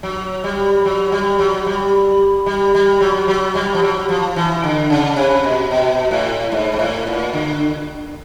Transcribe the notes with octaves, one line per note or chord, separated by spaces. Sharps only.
F#3
G3
F#3
G3
F#3
G3
G3
G3
F#3
F#3
G3
F3
F#3
F3
E3
D3
C#3
C3
B2
B2
A2
G#2
G#2
A2
A#2
D3